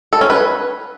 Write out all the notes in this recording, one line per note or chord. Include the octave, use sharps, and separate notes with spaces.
A4
C#4
B4